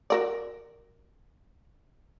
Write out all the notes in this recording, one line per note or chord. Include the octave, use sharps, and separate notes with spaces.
F#4 A#4 D5